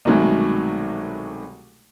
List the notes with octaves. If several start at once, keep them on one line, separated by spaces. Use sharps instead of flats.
C2 B2 D#3 F#3 G#3 A3